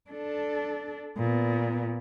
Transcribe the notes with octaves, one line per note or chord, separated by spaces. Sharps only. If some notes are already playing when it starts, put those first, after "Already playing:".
D4 A4
A#2 B3